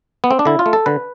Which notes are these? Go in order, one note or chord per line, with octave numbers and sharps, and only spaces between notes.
B3
C4
D4
D3 E4
F4
A3
A4
D3 B4